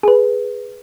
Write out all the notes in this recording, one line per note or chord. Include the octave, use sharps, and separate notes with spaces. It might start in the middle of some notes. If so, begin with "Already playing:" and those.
G#4 B4